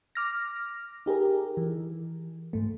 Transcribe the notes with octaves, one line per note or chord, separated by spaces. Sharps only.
D6 F6 A#6
D#4 G4 G#4 A#4
E3
G#2 A3